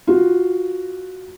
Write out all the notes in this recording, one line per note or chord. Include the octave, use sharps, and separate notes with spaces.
F4 F#4